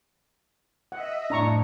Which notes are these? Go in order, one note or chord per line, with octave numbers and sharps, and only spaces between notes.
D#5 E5 F#5
F2 A2 D4 A#5 C#6